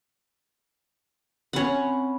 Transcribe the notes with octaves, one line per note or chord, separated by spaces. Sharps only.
C4 C#4 F#5 B5